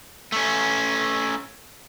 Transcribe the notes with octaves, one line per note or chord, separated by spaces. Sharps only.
A3 C#4